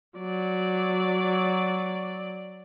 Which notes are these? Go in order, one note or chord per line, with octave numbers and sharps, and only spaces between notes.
F#3 D5